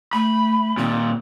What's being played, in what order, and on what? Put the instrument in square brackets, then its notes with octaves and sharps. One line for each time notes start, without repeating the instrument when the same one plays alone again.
[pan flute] A3 [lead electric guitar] B5
[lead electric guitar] D#2 A#2 [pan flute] C4